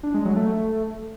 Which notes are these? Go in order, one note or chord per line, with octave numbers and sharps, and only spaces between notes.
D4
G#3
F#3
A3